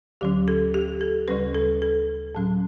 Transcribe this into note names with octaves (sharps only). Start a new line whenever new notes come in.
D2 D3 F#3 C#4 G4
A4
G4
A4
D2 C#3 G3 C#4 B4
A4
A4
A2 F#3 C#4